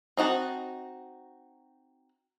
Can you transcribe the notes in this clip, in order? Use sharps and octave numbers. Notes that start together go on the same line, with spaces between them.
C4 D#4 F#4 A5